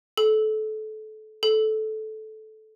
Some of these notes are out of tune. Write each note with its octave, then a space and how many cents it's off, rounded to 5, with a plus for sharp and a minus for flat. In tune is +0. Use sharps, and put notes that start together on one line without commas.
A4 -25
A4 -15